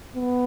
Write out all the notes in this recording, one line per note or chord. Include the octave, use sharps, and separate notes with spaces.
B3